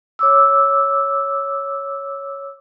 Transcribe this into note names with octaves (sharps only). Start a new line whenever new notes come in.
C#5 D6 E6